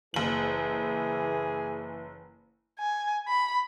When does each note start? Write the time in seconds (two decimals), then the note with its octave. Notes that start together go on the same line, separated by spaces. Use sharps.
0.14 F#1 E3 G#4 F#7
2.79 G#5
3.28 B5